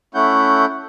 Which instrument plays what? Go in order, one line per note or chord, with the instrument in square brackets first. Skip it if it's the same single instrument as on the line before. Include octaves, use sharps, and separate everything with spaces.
[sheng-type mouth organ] A3 C#4 E4 F#5 G6